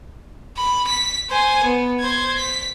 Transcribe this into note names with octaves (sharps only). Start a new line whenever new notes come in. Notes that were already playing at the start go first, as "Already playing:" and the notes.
B5
B6
C5 G#5
B3
C5 G#6
B6